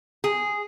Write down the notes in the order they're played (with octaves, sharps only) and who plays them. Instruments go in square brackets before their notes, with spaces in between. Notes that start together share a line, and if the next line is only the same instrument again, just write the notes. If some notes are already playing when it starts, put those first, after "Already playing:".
[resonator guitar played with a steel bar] G#4